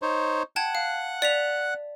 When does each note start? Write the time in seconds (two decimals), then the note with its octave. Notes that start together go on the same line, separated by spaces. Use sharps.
0.02 D#4 C5 C#5
0.56 F#5 G5 A5 F#6 G#6
0.75 F5
1.22 D5 B6 F7